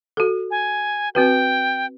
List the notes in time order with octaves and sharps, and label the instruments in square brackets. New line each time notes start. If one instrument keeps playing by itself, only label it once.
[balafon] F#4 A4
[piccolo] G#5
[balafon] C4 F#4 B4 [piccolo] G5